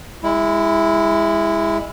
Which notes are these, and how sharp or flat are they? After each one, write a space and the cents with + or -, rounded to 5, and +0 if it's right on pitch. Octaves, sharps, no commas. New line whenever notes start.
G#3 -25 E4 +0